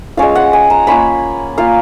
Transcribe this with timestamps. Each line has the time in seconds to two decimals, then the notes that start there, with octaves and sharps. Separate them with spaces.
0.17 G#3 C#4 F4 F5
0.35 F#5
0.53 G#5
0.70 A#5
0.87 A#3 C#4 F4 B5
1.58 A#3 F4 F5